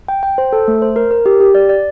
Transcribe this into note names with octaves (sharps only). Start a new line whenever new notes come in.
G5
G5
C5
A4
A3
C5
A#4
A#4
G4
G4
D5
D5